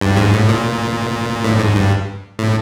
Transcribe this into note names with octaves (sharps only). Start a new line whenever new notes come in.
G2
G#2
A2
A#2
A2
G#2
G2
A2